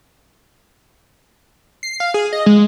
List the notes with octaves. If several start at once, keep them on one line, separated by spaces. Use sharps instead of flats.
C7
F5
G#4
D#5
G#3